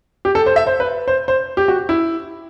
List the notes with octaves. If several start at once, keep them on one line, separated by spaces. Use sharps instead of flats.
G4
A4
C5
E5
C5
B4
C5
C5
G4
F#4
E4